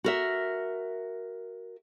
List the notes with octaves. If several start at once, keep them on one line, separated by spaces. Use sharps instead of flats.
F#4 A#4 E5